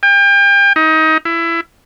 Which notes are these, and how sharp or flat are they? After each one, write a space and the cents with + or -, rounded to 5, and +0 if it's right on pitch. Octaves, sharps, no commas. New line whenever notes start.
G5 +35
D#4 +25
E4 +20